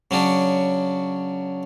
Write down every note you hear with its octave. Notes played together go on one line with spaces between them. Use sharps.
C#3 F#3 C#4 D4